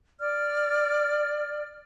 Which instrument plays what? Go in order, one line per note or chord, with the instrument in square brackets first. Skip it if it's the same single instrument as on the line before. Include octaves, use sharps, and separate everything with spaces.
[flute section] D5 F6